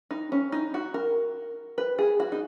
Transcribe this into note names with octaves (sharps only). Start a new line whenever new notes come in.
D#4
C#4
D#4
F#4
A#4
B4
G#4
F#4
D#4